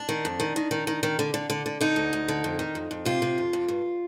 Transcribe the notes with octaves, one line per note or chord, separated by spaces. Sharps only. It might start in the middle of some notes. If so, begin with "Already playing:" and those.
Already playing: D4
D#3
F2
D#3
D#3
D#3
D#3
D#3
D3
D3
D3
D3
D3 D#4
D2
D2
D3
F2
D#3
F2
F2
C3 F4
C3
F2
F2
G2